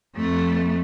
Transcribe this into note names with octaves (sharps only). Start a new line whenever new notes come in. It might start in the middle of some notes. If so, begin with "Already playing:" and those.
F2 A3